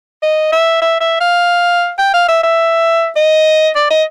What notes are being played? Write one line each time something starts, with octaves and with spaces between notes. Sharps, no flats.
D#5
E5
E5
E5
F5
G5
F5
E5
E5
D#5
D5
D#5